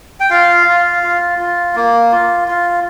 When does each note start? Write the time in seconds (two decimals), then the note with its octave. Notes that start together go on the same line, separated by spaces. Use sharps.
0.20 G5
0.30 F4 F5
0.67 F4
1.03 F4
1.38 F4
1.75 A#3
2.12 F4
2.48 F4